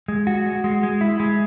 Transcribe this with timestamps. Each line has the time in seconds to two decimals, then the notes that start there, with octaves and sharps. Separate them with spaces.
0.08 G#3
0.27 F#4
0.46 G#3
0.64 G#3
0.83 G#3
1.01 E4
1.20 G#3